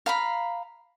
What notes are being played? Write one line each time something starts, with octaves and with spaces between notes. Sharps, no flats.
F5 A#5 B5